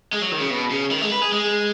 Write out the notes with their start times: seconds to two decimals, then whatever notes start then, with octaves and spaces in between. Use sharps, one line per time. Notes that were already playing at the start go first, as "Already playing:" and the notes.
0.13 G#3
0.22 F#3
0.32 D#3
0.40 C#3
0.50 B2
0.71 C#3
0.91 D#3
1.02 G#3
1.12 B4
1.22 G#4
1.32 G#3